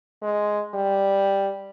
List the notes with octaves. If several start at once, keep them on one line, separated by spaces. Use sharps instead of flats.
G#3
G3